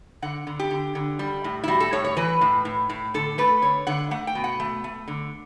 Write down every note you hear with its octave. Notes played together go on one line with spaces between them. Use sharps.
D3 F#5
D3
G4
D3
D3
G3
A2
E4
G3 F#4
A4
A2 C#5
C#5
E3 B4
A2
A2
A2
D3 A4
A3 B4
D3 C#5
D3 F#5
A3 F#5
G5
B2
F#5
A3
A3
D3